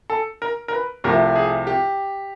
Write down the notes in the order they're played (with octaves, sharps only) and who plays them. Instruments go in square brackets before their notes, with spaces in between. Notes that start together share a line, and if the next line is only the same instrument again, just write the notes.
[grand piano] A4
A#4
A#4
B4
C2 C3 F3 A3 A#4
G#4
G4